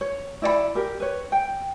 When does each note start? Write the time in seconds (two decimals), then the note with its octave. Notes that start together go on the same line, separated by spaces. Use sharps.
0.01 C#5
0.42 E4 D5 D#5 B5
0.75 G4 A#4
1.00 B4 C#5
1.32 G5